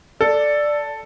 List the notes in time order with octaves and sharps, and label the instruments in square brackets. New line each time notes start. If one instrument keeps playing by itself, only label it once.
[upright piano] A4 [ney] D5